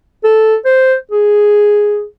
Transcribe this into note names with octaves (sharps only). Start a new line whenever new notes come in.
A4
C5
G#4